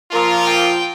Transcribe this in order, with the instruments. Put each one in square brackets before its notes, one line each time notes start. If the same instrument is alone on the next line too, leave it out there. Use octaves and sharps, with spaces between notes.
[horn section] A#2 F3 A#3 F4 [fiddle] A#4
[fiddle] G5